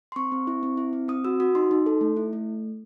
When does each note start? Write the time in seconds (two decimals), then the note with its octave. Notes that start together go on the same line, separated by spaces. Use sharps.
0.12 C6
0.16 C4 C#6
0.32 C4
0.47 E4
0.63 C4
0.77 E4
0.93 C4
1.08 C4 D#6
1.24 F#4 E6
1.40 F#4 D#6
1.55 D#4 C6
1.71 D#4
1.86 A4
2.01 A3
2.16 E4
2.33 A3